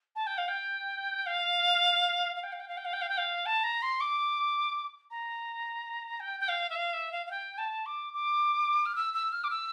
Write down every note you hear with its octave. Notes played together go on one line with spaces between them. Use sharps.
A5
G5
F5
G5
F5
F5
G5
F5
G5
F5
G5
F5
G5
F5
G5
F5
A5
A#5
C6
D6
A#5
G5
G5
F5
E5
F5
E5
F5
F5
G5
A5
D6
D6
F6
E6
E6
F6
D6
E6